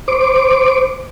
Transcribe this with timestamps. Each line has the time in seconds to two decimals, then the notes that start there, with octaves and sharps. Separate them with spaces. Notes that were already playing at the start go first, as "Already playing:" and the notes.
0.08 C5 D6